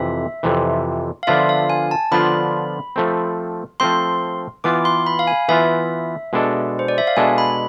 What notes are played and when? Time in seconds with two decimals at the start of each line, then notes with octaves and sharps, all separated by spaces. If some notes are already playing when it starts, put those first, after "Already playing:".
Already playing: F2 C3 E3 E5
0.43 F2 C3 E3
1.23 F5
1.27 D3 F3 B3 D4 F4 E5
1.49 F5
1.70 G#5
1.91 A5
2.12 D3 F3 B3 D4 F4 B5
2.96 F3 A3 C4
3.80 F3 A3 C4 C6
4.64 E3 B3 F4 D6
4.85 C6
5.06 B5
5.19 F5
5.27 G#5
5.49 E3 B3 F4 E5
6.33 B2 G#3 D4 A4
6.79 C5
6.88 D5
6.98 E5
7.07 F5
7.17 B2 G#3 D4 A4 G#5
7.38 B5